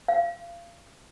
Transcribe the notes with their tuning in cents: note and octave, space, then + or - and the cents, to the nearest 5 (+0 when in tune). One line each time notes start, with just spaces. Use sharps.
F5 -30